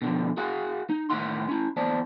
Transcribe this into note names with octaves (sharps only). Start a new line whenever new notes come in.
B2 D3 F3
F#4 G#4 F5 F#5
D#4
A2 D#3 E3 E5 F#5 C6
C#4 E4
E2 C5 D5 A5